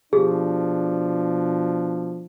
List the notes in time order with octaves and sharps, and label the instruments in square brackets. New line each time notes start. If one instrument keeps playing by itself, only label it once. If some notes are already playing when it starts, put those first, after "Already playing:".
[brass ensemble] B2 F3 D4 [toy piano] G4 [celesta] G#4